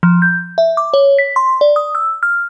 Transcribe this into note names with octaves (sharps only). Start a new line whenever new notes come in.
F3
G6
E5
D6
C#5
B6
C6
D5
D#6
E6
F6